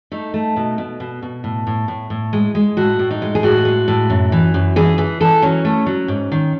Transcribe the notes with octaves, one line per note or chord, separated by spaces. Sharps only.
A3 D#4
A3
B2
B2
B2
B2
A2
A2
A2
A2
G#3
G#3
A2 F#4
A2
D#4
G#3
G#4
A2 F#4
G#3
A2
F#2
E3
F#2
E3 G#4
E3 G#4
E3 A4
F#3 C#4
A3
F#3
G#2
D#3